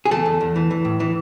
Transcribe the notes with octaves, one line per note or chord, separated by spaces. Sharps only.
G#4
E2 A3 A4
E2
E2
E3
E3
A2
E3